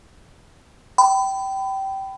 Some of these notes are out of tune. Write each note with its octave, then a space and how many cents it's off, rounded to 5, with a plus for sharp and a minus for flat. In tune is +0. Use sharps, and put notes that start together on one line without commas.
G5 -20 B5 +25